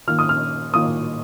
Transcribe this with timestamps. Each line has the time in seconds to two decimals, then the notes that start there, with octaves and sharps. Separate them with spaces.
0.08 D#3 A#3 F4 F6
0.19 D#6
0.29 F6
0.74 D#3 A#3 F4 D#6